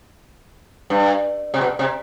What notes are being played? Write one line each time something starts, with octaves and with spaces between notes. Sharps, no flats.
G2
C3
B2
C3